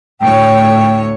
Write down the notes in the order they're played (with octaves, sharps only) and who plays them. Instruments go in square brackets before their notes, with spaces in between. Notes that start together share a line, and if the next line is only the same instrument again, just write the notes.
[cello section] D2 A2 C#5 [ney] G5